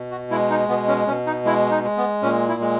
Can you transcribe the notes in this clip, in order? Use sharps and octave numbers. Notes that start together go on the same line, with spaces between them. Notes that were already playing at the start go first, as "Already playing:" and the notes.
Already playing: B2
F#4
G#3 E4
D#4
B2 B3
C#4
B2 C#4
D#4
G#3 E4
D#4
G#3
B3
A#2 C#4
E4
G#3